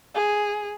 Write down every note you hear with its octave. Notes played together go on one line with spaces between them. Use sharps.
G#4